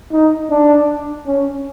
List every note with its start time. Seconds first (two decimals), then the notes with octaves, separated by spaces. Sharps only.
0.12 D#4
0.50 D4
1.26 C#4